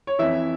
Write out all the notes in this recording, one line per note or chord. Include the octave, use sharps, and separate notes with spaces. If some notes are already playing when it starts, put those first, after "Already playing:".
C#5
F2 E3 E4 E5